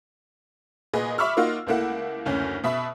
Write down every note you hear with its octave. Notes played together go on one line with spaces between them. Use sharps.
A#2 G#4 B4 D#5
E5 B5 C#6 D6 E6 F6
A#3 D#4 F4 F#4
C#2 A3 A#3 E4 F#5
F#1 D2 C#4
B2 E5 B5